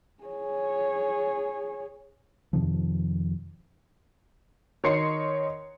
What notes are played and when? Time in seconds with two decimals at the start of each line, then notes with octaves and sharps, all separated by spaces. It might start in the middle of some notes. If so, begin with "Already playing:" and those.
0.24 G#4 C#5
2.53 F2 C3 D#3 F3
4.84 D#3 C#5 D#5 C6 C7 C#7